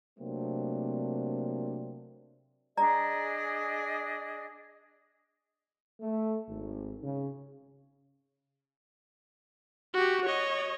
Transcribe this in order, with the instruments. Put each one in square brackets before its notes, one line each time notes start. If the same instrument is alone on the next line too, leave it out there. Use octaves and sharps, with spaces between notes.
[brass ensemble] C3 F#3 A3 A#3 C4 D4
[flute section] D4 G#4 D#5 [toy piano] D5 A#5
[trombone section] A3
G#1
C#3
[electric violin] F#4 G4
C#5 D#5